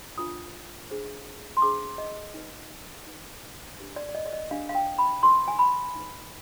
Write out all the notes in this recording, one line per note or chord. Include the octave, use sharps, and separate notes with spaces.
D4 F4 B4 D#6
D4 G#4 C5
C6
D4 G#4 C5 D6
D#5
D#4 B4
D#4 B4
D4 G4 B4
D5
D5
D#5
D5
D#5
D4 G4 B4 F5
F5
G5
B5
D#4 B4 C6
G#5
B5
D#4 B4